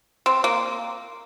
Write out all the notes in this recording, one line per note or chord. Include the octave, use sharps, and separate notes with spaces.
C4
A#3